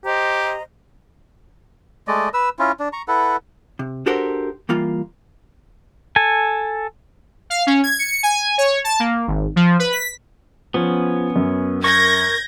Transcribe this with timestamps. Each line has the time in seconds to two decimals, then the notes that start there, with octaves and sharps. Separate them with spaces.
0.05 G4 C5 D#5 A#5
2.08 G#3 A3 D5 D#5
2.34 B4 E6
2.59 C#4 E4 F4
2.80 D4
2.93 A#5 C#6
3.08 E4 A4 B4 F#5
3.79 C3
4.06 D4 F#4 G4 A4 A#4 C5
4.69 E3 G3 A#3 F4
6.16 A4 G#5
7.50 F5
7.67 C#4
7.84 G#6
7.99 C#7
8.23 G#5
8.58 C#5
8.84 A5
9.00 A#3
9.27 G#1
9.56 F3
9.79 B4
9.92 B6
10.74 F3 B3 C#4
11.36 F#2
11.84 A#4 C#6 G6 G#6 A#6